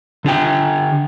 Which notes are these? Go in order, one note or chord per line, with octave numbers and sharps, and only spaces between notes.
D3 D4 G4 G5